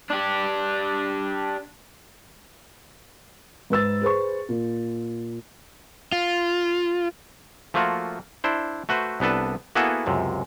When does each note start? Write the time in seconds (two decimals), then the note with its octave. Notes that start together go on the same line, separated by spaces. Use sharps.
0.10 D4 G4
3.70 G#2 B4 E6 A6
4.02 G#4 B4 C5 C#6
4.49 A#2
6.12 F4
7.74 F3 A3 A#3 F4 F#4
8.44 D4 E4 C5
8.89 A3 F#4 B4 C5
9.20 C2 B3 D4 A4 B4
9.75 A#3 B3 E4 F#4 G#4 A4
10.06 C#2 F#2 C3